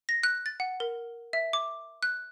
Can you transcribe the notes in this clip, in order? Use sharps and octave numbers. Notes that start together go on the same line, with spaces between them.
A#6
F#6
A6
F#5
A#4
E5
D6
F#6